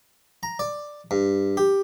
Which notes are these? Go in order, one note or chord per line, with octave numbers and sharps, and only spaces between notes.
A#5
D5
G2
G4